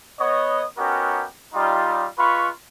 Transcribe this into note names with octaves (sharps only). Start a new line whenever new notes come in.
B3 C#5 D#5
B3 C#4 D#4 F#4 G4 A#4
G3 D#4 F4
G#3 F4 B4 B5 C#6